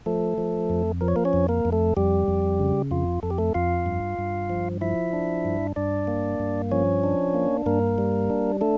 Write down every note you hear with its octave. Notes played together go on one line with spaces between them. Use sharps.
F3 A3 A4
F3
F2
F3 A#4
C#5
A#3 A#4
C#4 C#5
F2
A#3 A#4
F2
A3 A4
F2 G3 G4
F2
C#3
F2 F4
F2 A4
G4
A3 A4
F2 F4 F5
G2
G2
F3
F3 E4 E5
D4
G2
G2 D4 D5
A#3
G2
F3 C#4 C#5
D4
A#3
G2 A#3 A#4
G3
D4
A3 D4 A4